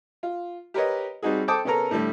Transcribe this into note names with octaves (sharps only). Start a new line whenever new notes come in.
F4
G4 A#4 B4 C#5 D#5
G3 C4 D#4 F#4 G#4
A4 C5 G5 A5 D6 D#6
C#3 B3 C#4 A4 A#4 A#5
A2 D3 G3 A3